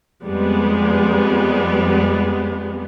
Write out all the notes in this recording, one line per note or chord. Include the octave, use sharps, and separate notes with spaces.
F2 G3 G#3 B3